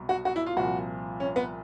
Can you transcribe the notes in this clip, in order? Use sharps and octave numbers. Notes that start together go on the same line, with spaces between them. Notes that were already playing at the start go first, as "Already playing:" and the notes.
Already playing: C2 B2 F#3
F#4
F#4
E4
F4
C2 A#2 F3 F#4
C#4
B3